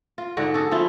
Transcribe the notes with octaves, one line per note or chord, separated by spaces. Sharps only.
F4
G#2 D3 F#4
F#4 G#4 A4
F3 E4 F4